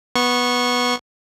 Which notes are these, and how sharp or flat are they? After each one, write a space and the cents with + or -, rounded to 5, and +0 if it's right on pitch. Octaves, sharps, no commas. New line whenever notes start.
B3 -5 C#6 -20